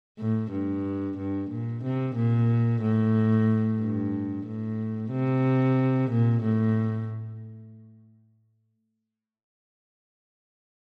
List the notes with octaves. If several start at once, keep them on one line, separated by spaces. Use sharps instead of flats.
A2
G2
G2
A#2
C3
A#2
A2
G2
A2
C3
A#2
A2